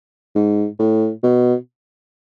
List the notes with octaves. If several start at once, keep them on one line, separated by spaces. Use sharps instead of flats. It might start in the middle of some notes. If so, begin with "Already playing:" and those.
G#2
A2
B2